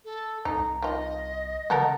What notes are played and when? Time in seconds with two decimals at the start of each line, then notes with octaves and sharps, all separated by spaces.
0.05 A4
0.45 C2 D#4 A#5
0.82 D#3 F4 D#5
1.70 C#3 B3 A4 A#4